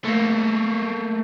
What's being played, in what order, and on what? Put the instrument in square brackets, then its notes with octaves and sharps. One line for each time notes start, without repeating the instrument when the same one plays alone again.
[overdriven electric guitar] A3 A#3